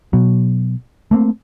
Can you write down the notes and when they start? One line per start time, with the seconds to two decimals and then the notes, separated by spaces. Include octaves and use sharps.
0.13 B2 F#3
1.11 A3 A#3 C4